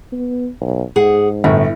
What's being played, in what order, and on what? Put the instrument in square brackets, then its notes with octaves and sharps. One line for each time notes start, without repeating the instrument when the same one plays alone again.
[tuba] B3
B1
[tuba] G#2 [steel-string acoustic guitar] G#4 F#5
[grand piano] G1 [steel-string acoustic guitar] A2